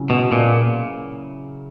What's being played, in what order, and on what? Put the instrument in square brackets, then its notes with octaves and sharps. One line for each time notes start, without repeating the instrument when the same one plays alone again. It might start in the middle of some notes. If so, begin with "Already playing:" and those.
Already playing: [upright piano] C#3 F#3 C#4 E4
[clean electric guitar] B2
A#2